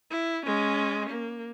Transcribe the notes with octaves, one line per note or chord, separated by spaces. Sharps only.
E4
G#3 C#4
A#3